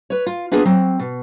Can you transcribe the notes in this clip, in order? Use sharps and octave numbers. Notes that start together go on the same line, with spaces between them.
B4 C#5
F4
A#3 B3 D4 F4 G#4
F#3 C4
B2